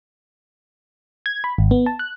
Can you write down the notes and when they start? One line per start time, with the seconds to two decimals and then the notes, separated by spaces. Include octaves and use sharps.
1.26 G#6
1.44 B5
1.58 G#1
1.71 B3
1.86 A5
1.99 F#6